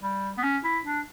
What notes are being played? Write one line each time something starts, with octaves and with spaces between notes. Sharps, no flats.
G3
B3
C#4
E4
D4